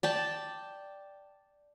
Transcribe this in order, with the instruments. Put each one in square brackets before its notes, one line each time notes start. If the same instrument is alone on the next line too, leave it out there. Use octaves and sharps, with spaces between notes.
[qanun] D5 G5 A5